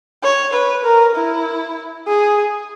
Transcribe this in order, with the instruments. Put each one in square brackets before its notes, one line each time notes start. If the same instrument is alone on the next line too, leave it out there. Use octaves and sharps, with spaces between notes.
[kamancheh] C#5
B4
A#4
E4
G#4